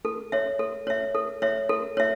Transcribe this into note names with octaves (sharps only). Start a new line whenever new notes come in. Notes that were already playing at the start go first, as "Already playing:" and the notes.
A4
C#5 E5
A4
C#5 E5
A4
C#5 E5
A4
C#5 E5